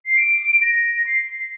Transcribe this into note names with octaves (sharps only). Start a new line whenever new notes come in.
C7
D7
A#6
C7